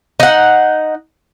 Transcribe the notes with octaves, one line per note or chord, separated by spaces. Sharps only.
D#4 F#5